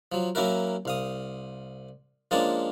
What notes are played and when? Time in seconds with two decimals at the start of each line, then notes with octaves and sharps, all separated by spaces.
0.12 F3 F#3
0.35 F#3 A#3 C#4 E4 F#4 A#4
0.85 C2 F5 D#6
2.31 F3 G#3 A#3 C#4 D4 A5